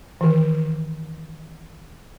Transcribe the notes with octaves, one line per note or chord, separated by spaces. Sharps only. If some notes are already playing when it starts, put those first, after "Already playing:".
D#3 E3